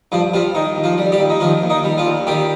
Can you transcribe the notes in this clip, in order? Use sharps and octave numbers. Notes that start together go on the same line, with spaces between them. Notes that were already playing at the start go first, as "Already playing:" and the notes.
G2 F3 F4
F3 G3 F4
D#3 D#4
D#2
F3 F4
G3
G3 G4
D#2
D#4
D#3 F3 F4
D#2
D#3 D#4
G3
F3 F4
D#2
D#3 G3 G4